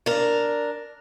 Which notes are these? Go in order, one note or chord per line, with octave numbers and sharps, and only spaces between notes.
D4 A#4